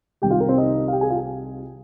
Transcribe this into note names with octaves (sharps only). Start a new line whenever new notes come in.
C2 C3 D#3 G3 G4 G5
F4 F5
A#4
C4 C5
D#4 D#5
F5
G4 G5
G#4 G#5
F4 F5